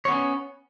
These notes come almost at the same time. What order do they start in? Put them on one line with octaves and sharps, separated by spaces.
C#5 B3 C#4